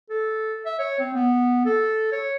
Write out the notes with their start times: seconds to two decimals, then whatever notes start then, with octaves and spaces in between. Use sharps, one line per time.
0.10 A4
0.66 E5
0.79 C#5
0.99 C4
1.14 B3
1.66 A4
2.12 C#5